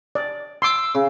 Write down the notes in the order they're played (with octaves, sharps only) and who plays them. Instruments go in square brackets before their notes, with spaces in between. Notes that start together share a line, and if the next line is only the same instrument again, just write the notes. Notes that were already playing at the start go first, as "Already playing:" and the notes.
[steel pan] D5
[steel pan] C6 D6 [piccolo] E6
[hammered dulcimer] C#3